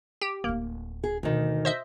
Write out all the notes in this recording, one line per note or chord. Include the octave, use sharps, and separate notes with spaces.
G4
D1 A#3 D#4
G#4
D2 B2 D#3 A3
C5 D#5 E5